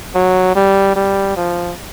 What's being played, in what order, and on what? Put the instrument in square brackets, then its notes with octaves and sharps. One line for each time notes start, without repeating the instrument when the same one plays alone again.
[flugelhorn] F#3
G3
G3
F3